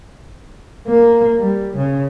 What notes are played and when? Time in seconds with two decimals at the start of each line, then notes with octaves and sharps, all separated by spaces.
0.88 A#3
1.39 G3
1.77 C#3